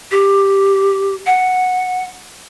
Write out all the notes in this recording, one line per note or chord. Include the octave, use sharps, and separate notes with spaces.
G4
F#5